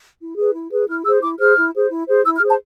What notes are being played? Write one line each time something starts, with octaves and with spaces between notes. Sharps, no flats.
E4
G#4 B4
E4
G#4 B4
E4 F6
G#4 C5 E6
E4 D6
G#4 C5 F6
E4
G#4 C5
E4
G#4 C5
E4 E6
F6
G#4
C5 A5